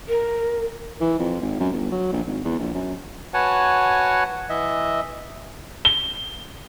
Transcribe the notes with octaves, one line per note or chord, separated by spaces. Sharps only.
A#4
E3
F2
G#1
F#2
G1
F#3
A#1
G#1
E2
A#1
F#2
F#4 B4 C#5 F#5 G#5 A5
E3 D#5 E5
G7